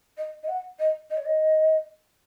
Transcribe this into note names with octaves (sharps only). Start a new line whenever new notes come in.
D#5
D#5
F#5
D#5
D#5
C#5
D#5